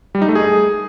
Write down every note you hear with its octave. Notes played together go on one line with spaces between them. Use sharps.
G3
D#4
A3
G#4